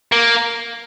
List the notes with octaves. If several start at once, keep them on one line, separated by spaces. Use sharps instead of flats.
A#3